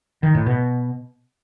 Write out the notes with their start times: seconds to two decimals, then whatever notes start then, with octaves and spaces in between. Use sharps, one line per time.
0.23 D#3
0.35 A2
0.46 B2